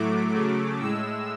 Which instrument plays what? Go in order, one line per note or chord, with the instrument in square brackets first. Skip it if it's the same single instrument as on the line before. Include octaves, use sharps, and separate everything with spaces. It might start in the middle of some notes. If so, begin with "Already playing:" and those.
Already playing: [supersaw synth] A2 F#3 A3 D6
C#3 F#3 A3
A2 G#3 E6